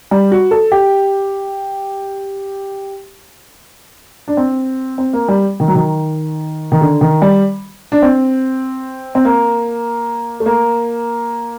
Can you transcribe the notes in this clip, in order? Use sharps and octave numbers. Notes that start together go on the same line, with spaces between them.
G3
F#4
A4
G4
D4
C4
C4
A#3
G3
D#3
F#3
D#3
D#3
D3
D#3
G3
D4
C4
C4
A#3
A3
A#3